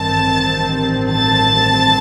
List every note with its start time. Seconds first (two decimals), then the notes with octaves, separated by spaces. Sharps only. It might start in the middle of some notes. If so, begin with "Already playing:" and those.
Already playing: A1 G2 D#3 G3 C4 A5 A6
1.11 A5 A6